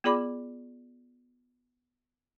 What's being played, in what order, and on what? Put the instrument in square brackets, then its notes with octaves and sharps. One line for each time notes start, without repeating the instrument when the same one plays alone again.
[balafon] B3 F4 G#4 D5 B5 D6